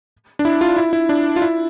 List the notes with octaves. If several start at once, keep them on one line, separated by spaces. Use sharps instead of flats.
D4
E4
F4
E4
E4
D4
F4
E4